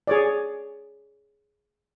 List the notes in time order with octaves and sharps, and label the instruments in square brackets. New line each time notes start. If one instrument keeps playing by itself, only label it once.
[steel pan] G#4 C#5 D5